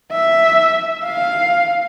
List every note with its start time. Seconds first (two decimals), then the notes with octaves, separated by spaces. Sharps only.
0.12 E5
1.04 F5